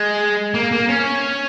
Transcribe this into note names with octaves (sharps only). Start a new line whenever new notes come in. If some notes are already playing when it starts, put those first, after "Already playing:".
Already playing: G#3
A#3
A#3
C#4